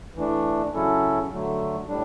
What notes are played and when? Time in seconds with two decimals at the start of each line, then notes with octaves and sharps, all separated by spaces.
0.16 E3 A3 D4
0.73 C#3 F#3 C#4 E4 A4
1.31 D3 F#3 A3
1.88 A2 G3 D4